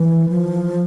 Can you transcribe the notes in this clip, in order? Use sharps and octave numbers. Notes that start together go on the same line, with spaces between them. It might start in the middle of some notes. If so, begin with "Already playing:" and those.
Already playing: E3
F3